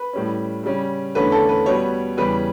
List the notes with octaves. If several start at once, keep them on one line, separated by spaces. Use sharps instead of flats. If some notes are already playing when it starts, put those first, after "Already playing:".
Already playing: B4
A2 G3 C#4
C#3 G3 C#4
E2 D3 A3 C#4 B4
A4
B4
B2 G3 B3 C#5
E2 C#3 G3 C#4 B4